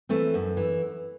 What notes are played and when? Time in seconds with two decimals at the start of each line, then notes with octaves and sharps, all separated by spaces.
0.09 E3 A3 C4
0.34 F#2
0.57 E3